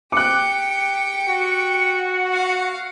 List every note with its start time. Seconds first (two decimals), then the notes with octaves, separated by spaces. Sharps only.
0.12 G4 G5 D6 F#6 C#7
1.28 F#4
2.32 F5 F#5